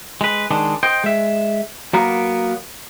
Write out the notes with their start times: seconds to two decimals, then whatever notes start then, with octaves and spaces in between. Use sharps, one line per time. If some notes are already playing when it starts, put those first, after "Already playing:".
0.21 G#3 B4
0.51 D#3 G#3 D4
0.83 C5 D#5 G5
1.04 G#3 E5
1.93 F#3 A#3 B3 A#4